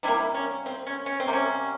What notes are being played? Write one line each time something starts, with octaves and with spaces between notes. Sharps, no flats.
C3 G3 A#3 E4
C#4
C4
C#4
C#4
C4
C3 G3 A#3
C#4